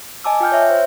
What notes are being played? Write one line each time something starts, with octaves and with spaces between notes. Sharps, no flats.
D#5 G#5 A5 D6 E6
F4 G5 F6 G6
C#5 E5 E6
C5